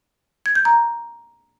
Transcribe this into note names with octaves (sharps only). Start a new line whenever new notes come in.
G#6
G6
A#5